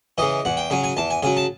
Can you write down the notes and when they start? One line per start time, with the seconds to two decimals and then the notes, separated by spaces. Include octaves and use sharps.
0.18 C#3 E3 D#5
0.45 E2 F#5
0.57 G5
0.70 C#3 F#3 G#5
0.84 G#5
0.97 E2 A5
1.11 G#5
1.23 C#3 F#3 G#5
1.37 A5